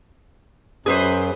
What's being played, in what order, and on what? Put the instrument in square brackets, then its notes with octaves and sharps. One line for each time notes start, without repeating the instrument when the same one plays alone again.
[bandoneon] F#2 [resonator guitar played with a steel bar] G#4 B4 C5